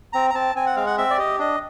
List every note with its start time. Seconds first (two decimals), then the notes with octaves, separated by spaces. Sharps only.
0.13 C4 A#5
0.30 A#5
0.34 C4 A5
0.55 C4 G#5
0.66 F#5
0.76 G#3 F5
0.86 F#5
0.98 C4 E5
1.10 D5
1.18 G4 D#5
1.39 D4 D#5